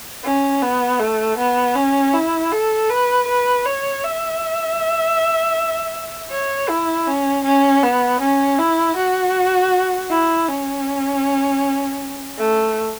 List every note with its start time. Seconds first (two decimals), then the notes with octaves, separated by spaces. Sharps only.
0.24 C#4
0.62 B3
1.00 A3
1.38 B3
1.76 C#4
2.14 E4
2.52 A4
2.90 B4
3.27 B4
3.65 C#5
4.04 E5
6.31 C#5
6.69 E4
7.07 C#4
7.45 C#4
7.83 B3
8.21 C#4
8.59 E4
8.97 F#4
10.10 E4
10.48 C#4
12.38 A3